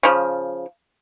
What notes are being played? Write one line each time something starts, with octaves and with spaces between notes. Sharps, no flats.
C#3 F3